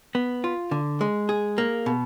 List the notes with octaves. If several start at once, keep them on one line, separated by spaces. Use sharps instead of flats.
B3
F4
D3
G#3
G#4
A#3
B2